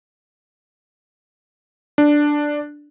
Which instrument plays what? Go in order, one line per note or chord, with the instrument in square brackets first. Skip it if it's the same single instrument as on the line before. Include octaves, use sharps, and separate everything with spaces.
[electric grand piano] D4